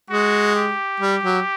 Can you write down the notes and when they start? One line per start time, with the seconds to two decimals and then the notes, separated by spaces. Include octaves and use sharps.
0.10 G#3 F#4
0.55 G4
1.00 G3
1.23 F#3